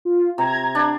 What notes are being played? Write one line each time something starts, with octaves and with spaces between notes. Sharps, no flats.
F4
C3 A#5 G#6
D4